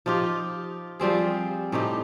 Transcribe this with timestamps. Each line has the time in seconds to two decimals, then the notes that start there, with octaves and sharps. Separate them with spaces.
0.06 F3 D#4 F4 G4
0.99 F3 G3 C4 G#4
1.72 A2 C3 D#4 G4